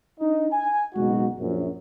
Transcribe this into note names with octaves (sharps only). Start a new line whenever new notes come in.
D4 D#4 D#5
G#5
F#1 B2 G#3 D#4 F#4
A#1 F#2